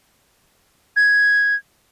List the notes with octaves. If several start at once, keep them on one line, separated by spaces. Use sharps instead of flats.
G#6